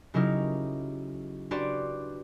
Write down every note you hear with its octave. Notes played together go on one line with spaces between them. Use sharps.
C#3 F#3 D#4 E4 G4 A#4
D4 F#4 G4 B4 C5 D5